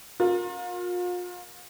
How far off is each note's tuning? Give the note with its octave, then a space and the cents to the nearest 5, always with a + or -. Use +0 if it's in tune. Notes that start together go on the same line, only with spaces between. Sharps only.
F4 +40 A#4 +0